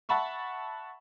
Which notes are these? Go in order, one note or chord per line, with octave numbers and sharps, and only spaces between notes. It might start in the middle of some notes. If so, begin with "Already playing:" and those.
E5 F#5 A5 B5 C#6